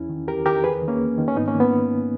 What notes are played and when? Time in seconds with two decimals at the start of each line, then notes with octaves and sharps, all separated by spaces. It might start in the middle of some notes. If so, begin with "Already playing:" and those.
Already playing: E2 C#4 E4
0.09 D#3
0.28 E2 G4 A#4
0.45 D#3 G4 A#4
0.64 E2 G#4 B4
0.82 D#3
0.88 A#3 C#4
1.01 E2
1.18 D#3
1.28 C#4
1.36 G#2 B3 D#4
1.48 A#3 C#4
1.54 D#3
1.60 B3